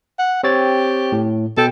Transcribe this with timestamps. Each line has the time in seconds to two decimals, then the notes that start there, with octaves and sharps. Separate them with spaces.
0.19 F#5
0.43 C4 G4 C#5 A6
1.12 A2
1.57 B2 A4 G5